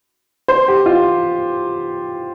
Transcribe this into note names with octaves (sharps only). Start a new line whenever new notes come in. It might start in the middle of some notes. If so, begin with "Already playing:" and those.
C5
G4
F4